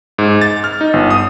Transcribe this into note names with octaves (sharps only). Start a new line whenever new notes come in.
G#2
A6
F6
D#4
G1
D#6